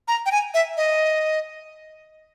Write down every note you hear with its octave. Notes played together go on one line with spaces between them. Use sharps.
A#5
G5
G#5
E5
D#5